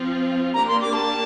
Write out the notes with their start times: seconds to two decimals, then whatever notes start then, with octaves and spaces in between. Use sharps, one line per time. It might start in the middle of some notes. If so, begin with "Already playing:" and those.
Already playing: F3 C4 F4
0.54 A#3 D4 G4 D5 A#5
0.68 C6
0.81 D6
0.93 A5